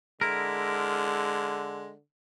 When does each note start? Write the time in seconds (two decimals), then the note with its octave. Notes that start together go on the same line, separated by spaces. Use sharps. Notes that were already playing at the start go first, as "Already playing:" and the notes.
0.21 D3 G#3 E4 A#4